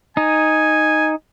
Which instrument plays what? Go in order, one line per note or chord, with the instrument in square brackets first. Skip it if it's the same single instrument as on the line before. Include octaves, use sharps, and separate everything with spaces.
[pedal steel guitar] D#4 [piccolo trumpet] G#5